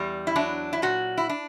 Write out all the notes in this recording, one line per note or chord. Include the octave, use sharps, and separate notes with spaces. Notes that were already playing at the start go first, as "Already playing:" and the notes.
Already playing: E2 G3
E4
F#3 D4
E4
A#2 F#4
E4
D4